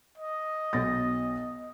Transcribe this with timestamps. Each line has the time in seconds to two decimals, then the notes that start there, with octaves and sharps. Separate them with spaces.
0.18 D#5
0.73 B1 A6 A#6